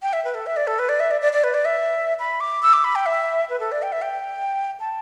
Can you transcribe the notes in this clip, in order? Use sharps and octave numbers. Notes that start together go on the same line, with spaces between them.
G5
E5
B4
A4
E5
D5
A4
B4
D5
E5
D5
D5
D5
B4
D5
E5
B5
D6
E6
D6
B5
G5
E5
B4
A4
D5
G5
E5
G5
A5